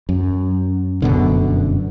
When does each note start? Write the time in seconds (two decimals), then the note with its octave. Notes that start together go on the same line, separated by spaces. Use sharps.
0.09 F#2
1.02 F1 F#2 B2 D3